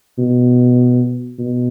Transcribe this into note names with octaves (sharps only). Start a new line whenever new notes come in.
B2
B2